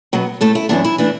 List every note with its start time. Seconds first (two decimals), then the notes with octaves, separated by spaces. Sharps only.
0.13 B2 F#3 B3
0.41 A2 A3 A4
0.55 E4
0.69 F#2 E3 B3 D4
0.84 E4
0.98 E3 A3 D4